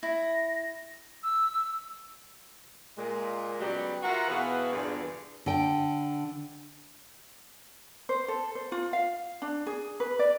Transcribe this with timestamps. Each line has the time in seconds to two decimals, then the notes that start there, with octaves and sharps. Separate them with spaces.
0.03 E4 A#6
1.23 E6
2.96 A#2 G#3
3.60 C#3 F#3 G3 B3 G4
4.03 F4 F#4 A#4 E5 F#5
4.28 B2 E3 B3 F#4 G#4 F5
4.72 E2 G2 A#2 D3 E3 G#4
5.46 D3 G5
8.09 C5
8.28 A4
8.55 C5
8.72 F4
8.93 F5
9.42 D4
9.67 G#4
10.00 B4
10.19 D5